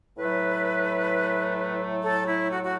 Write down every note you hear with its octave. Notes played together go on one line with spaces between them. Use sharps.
A2 F#3 A3 E4 B4
A4
E4
F#4
F#4